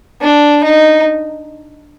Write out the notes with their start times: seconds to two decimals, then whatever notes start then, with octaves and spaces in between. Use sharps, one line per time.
0.21 D4
0.64 D#4